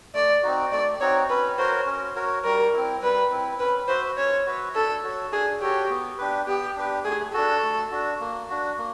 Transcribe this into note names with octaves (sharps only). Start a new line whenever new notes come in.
A3 D5
C4 D#4 F#4
A3 D5
C4 D#4 F#4 C#5
C#4 B4
F#4 A#4 C5 C#5
C#4
F#4 A#4 C#5
G3 A#4
C4 E4
G3 B4
C4 E4
C#4 B4
F#4 B4 C5 E5
C#4 C#5
F#4 B4 E5
D4 A4
F#4 A4 C#5
D4 G#4
F#4 G4 A4 C#5
B3
D4 G4 B4
B3 G4
D4 G4 B4
A3 G#4
D4 F#4 A4
A3
D4 F#4
A#3
D4 F#4
A#3